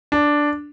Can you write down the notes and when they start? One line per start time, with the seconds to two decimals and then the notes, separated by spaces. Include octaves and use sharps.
0.12 D4